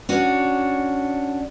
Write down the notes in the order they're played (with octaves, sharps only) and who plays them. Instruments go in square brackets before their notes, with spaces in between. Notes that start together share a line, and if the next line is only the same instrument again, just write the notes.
[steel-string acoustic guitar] C#4 D4 F#4